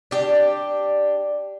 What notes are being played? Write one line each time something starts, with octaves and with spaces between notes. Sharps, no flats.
D4 G4